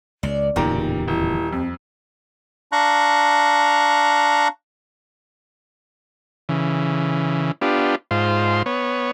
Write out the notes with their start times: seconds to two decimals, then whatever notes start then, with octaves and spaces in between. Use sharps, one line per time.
0.23 C#2 D5
0.56 D1 E2 A#2 C#3 D#4 G4 A#5
0.78 D#4
1.08 D#1 E4
1.53 F2 C4
2.72 D4 F5 A#5 C#6 F#6
6.49 C#3 E3
7.62 B3 D4 F4 G4
8.11 G#2 F4 C5
8.66 B3 C#5